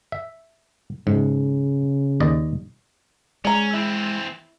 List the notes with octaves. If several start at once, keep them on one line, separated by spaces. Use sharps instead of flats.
E5
G#2 C#3
D#2 D5 D#5
G#3 C#4 D5 A#5
E3 C4 E4